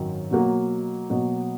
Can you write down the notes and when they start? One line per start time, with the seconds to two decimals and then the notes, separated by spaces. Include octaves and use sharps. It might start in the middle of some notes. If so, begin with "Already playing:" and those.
Already playing: G#1 F#2 D#3 F#3
0.31 B2 F#3 A#3
1.10 B2 F#3 A#3